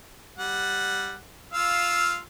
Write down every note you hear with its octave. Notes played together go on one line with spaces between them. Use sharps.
G3 F#5
F4 F5 E6